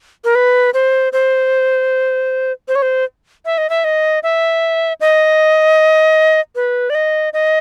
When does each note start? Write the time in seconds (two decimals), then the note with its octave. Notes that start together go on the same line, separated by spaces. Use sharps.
0.25 A#4
0.35 B4
0.74 C5
1.13 C5
2.68 C5
2.75 C#5
2.82 C5
3.46 E5
3.58 D#5
3.70 E5
3.84 D#5
4.23 E5
5.01 D#5
6.56 B4
6.90 D5
6.95 D#5
7.33 D#5